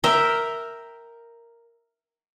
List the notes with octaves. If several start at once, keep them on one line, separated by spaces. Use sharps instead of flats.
A#4 E5 G5 A#5